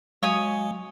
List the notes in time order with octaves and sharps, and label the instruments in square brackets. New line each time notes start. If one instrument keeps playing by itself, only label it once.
[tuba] F#3 [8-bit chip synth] G#3 [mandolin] C#5 G#5 D#6 [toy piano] F5